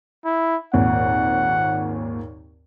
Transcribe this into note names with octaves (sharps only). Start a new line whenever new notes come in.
E4
G#1 D#2 A#2 F#5